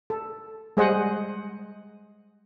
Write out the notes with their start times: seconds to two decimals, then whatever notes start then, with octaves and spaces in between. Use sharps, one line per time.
0.10 A4
0.77 G3 G#3 G#4 C5 D#5 F#5